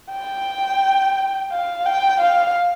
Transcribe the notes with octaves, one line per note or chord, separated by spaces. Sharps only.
G5
F5
G5
F5